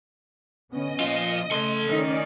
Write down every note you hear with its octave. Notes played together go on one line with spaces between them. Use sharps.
D3 B3 C#4 D#5 D#6
A#2 F3 F4
C#3 A3 A4 C6
D#3 C#4 D#4 D5